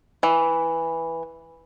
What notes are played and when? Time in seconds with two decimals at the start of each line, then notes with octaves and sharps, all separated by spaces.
0.23 E3